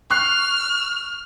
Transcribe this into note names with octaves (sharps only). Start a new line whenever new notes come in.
C#6 F6 F#6 C7